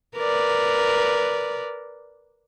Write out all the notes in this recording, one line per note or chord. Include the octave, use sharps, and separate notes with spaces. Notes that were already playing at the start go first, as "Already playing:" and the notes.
A#4 B4 D5